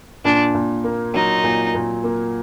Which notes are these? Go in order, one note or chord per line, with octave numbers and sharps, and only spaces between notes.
A#2 D4
A#2
A#3
F#3 D#4
A#2
A#2
A#3